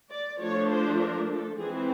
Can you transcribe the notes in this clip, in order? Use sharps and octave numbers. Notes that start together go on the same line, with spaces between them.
D5
F3 A3 D4 C#5
C5
A#4
A4
E3 G#3 C4 G#4